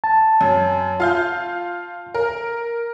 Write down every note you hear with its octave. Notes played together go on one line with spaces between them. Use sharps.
A5
F#2
F4 F5 G6
A#4